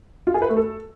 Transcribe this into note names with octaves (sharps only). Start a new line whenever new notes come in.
F4
G#4
B4
A3
A4